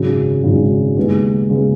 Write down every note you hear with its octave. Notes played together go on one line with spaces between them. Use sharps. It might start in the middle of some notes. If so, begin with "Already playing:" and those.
Already playing: G#1 F#2 C#3
G#1 F#2 C#3
D#2 C#3 G#3 B3
C#3 G#3 B3